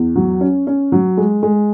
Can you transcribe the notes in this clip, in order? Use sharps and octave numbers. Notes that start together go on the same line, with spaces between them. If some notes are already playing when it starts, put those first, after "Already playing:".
Already playing: E2
F#3
C#4
C#4
F#3
G#3
G#3